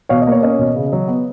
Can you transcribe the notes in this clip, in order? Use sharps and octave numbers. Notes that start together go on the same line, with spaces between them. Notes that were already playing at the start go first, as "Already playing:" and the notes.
B2 C#5 F5
D#5
A#3 C#5
C#4 D#5
B2
C#3
F#3
B3